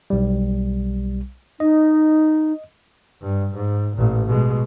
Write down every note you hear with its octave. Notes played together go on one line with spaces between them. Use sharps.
B1 G3
D#4 D#5
G2
G#2
A1 A#2
B2 G#3